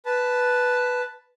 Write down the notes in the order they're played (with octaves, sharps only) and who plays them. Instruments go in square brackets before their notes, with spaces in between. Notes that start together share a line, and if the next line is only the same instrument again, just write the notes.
[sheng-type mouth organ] B4 A5